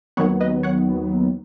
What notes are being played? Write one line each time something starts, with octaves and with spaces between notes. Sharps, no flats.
D#2 D#3 F#3 B3 C#5 F#5
B4 D#5
C#5 F#5